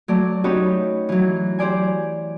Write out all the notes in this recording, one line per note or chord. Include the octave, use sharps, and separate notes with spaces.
F#3 A3 D5
C#4 D#4 F#4 G4 B4 C#5
E3 F#3
G4 C5 D5 G#5